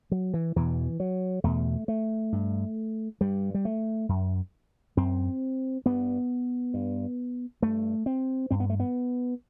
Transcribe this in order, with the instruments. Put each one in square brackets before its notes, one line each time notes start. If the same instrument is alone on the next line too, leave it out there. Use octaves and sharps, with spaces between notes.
[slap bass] F#3
E3
E2 B2 E3
F#3
E2 B2 A3
A3
G2
G2 G3
G3
A3
F#2
F#2 C4
G2 B3
G2
G2 A3
C4
G2 C4
B3
A3
B3